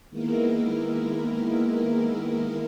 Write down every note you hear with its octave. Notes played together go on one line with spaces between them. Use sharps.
D#3 G#3 A#3 B3 E4 A#4